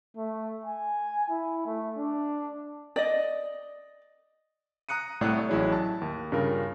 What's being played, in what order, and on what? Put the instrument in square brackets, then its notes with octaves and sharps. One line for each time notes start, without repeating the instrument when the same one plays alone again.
[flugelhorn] A3
G#5
E4
A3
D4
[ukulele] D5 D#5
[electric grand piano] A#5 D#6 F#6 C#7 D#7
C2 A2 A3 D5 E6 F#6
A1 F#3 E4 G#4 C#5
A5
D#2
G2 C#3 G3 F4 A#4